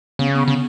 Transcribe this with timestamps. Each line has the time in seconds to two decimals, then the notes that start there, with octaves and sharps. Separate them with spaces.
0.19 C#3 B3
0.35 B3
0.48 C#3